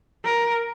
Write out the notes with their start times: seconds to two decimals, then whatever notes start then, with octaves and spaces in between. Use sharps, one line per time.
0.25 A#4